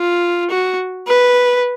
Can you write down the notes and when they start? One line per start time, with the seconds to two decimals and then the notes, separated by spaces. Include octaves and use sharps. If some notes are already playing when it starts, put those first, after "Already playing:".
Already playing: F4
0.50 F#4
1.08 B4